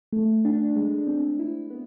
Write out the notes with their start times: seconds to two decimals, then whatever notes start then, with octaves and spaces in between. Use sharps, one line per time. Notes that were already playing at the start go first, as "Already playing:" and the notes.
0.12 A3
0.45 D4
0.76 G#3
1.07 C4
1.39 E4
1.71 B3